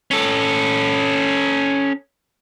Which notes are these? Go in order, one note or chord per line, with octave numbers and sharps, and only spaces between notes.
C#4 A4